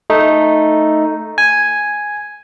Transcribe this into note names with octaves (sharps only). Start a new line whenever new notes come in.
A3 D#4
G#5